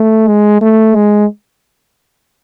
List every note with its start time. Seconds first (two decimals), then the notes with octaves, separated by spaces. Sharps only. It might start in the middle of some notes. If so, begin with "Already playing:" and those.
Already playing: A3
0.28 G#3
0.61 A3
0.95 G#3